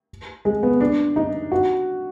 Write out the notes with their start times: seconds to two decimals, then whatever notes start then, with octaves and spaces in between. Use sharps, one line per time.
0.45 G#3
0.63 B3
0.81 D4
1.16 D#4
1.52 F#4